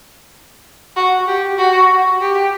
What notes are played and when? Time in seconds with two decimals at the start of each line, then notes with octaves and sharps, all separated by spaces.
0.97 F#4
1.28 G4
1.58 F#4
2.21 G4